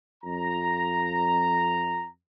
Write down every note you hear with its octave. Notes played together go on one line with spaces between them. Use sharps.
F2 A#5